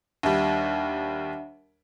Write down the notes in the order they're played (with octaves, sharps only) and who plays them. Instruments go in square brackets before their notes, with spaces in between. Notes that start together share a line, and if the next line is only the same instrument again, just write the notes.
[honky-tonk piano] D#2 G3 [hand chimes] D4 E5 F#5